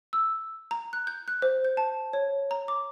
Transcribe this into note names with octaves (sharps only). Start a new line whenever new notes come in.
E6
A#5
F#6
G6
F#6
C5
G6
A5
C#5
A#5
D6